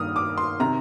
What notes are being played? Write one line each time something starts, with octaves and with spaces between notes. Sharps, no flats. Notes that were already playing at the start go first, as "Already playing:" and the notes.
Already playing: G2 D#3 A#3 D#6 F6
D6
C6
C3 D#3 A#5